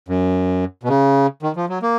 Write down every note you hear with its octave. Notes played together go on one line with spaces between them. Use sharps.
F#2
B2
C#3
D#3
F3
F#3
A#3